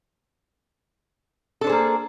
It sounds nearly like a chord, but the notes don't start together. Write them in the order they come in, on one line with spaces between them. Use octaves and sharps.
A4 D4 C5 G#4 A#3